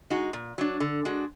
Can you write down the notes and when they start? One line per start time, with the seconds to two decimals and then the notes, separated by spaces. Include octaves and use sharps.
0.10 G#3 D#4 F#4
0.33 A#2
0.58 F#3 D4
0.80 D3
1.05 G#3 D4 F#4